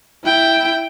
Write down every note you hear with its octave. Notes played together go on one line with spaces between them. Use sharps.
E4 G5